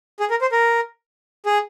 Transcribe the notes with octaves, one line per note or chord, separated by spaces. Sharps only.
G#4
A#4
C5
A#4
G#4